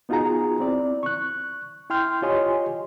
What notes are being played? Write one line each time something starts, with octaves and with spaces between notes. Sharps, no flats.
B3 D#4 F4 F#4 G#4 A#5
C4 E4 D5
C#6 F#6
E4 G5 C6 F6 G6
F4 G4 C#5 D#5 G#5 C6